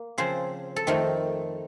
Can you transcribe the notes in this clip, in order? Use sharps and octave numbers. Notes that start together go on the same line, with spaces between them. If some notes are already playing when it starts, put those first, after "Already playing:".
Already playing: A#3
C#3 F3 C4 C5
A4
F2 D#3 A3 C4 A#4